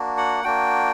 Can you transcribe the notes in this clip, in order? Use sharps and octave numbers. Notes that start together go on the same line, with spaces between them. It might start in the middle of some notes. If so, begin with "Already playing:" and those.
Already playing: A#3 D4 F#4
F#5
A#3 D4 F#4 G5